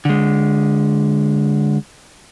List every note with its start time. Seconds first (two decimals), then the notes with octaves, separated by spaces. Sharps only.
0.05 D3 G#3